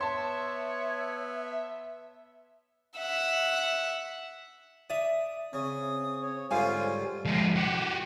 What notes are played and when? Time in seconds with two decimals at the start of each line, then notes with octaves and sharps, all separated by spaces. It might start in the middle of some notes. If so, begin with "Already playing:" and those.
0.01 B3 C#5 E5 A5 C6
2.98 E5 F#5
4.90 D5 E5 D#6
5.53 C#3 C4 D#6
6.22 C#5
6.51 G#2 D3 G3 C#4 F4 C5 F5 G#5
7.25 F3 G#3
7.56 F#4 G4